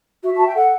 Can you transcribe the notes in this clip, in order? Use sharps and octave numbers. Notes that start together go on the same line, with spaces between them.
F#4 E5
F#4 A5
G5
A4 F#5